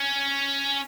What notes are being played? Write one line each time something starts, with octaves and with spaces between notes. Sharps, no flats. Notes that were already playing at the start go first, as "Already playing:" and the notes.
Already playing: C#4